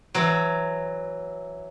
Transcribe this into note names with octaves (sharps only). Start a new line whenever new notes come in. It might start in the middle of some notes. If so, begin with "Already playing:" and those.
E3 F#3